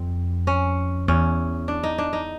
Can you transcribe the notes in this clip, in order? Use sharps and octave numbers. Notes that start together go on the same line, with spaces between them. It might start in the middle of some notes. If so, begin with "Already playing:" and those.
Already playing: F2 C4
C#4
E2 C#4
D4
D#4
D4
D#4